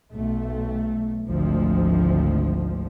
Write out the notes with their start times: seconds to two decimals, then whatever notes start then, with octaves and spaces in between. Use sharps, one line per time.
0.13 B1 A3
1.27 G#1 D2 F3